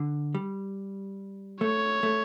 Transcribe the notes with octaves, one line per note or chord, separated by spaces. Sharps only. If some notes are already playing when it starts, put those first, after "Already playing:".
Already playing: D3
G3
A3 C#5
A3